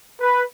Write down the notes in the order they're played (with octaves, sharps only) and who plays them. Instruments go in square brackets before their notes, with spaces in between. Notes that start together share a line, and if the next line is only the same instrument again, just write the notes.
[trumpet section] B4